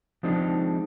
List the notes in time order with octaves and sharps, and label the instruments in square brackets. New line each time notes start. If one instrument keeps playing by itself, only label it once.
[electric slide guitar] F3 G#3 C4 D4 D#4